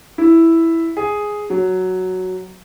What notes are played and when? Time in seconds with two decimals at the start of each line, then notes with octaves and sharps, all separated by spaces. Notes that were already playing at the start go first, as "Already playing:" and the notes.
0.18 E4
0.97 G#4
1.50 F#3